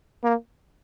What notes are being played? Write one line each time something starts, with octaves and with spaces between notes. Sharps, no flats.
A#3